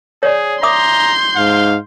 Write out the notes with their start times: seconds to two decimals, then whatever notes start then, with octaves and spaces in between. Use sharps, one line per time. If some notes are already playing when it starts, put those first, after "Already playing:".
0.23 G#4 C#5 D5
0.63 E5 A#5 C6 D6 D#6 G6
1.36 G#2 F5